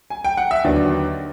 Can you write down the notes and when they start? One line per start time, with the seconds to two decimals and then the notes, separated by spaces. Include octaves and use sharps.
0.10 G#5
0.24 G5
0.37 F#5
0.51 E5
0.64 D#2 D3 F#3 B3 D5